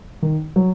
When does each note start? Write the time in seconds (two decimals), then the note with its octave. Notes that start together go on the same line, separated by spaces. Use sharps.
0.22 D#3
0.56 F#3